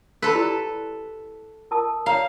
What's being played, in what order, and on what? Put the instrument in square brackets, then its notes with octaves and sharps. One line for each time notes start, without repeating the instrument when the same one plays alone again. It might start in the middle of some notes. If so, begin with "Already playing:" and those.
[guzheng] A4 B4 [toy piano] B5 C6 E6
[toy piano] E4 G4 D5
A#4 A5 D#6
[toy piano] C#5 D5 A#5 [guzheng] F5